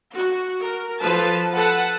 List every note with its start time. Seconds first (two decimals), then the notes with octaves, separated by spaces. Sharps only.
0.13 F#4
0.62 A#4
1.00 F3 A4 B4 A5
1.54 A4 B4 F#5 A5